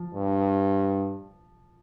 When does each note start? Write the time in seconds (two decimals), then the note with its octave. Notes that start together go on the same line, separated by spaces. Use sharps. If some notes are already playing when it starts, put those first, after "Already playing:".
Already playing: F3
0.14 G2